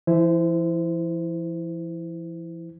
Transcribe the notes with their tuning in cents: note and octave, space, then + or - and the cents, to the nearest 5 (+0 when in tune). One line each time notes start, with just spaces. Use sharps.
E3 +45 E4 +0 C5 -25